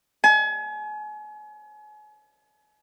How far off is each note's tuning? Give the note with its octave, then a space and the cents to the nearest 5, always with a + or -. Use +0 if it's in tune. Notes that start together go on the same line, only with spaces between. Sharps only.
G#5 +35